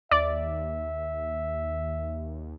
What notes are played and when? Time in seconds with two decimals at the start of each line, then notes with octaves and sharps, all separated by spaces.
0.11 D#2 D5 E5